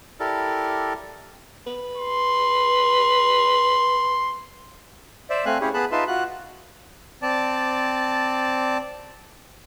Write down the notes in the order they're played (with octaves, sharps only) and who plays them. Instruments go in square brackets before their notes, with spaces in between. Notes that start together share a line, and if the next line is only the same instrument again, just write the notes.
[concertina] E4 G4 A4 A#4 D5
[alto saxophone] B4
[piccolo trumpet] C6
[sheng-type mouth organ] C5 D5 E5
A3 C4 F5 G#5 F#6
C#4 E4 G4 G#4 C#5
B3 G#4 A5 B5 F#6
D#4 F4 B4 E5 A5 C6
F4 F#4 F#6
C4 D5 A5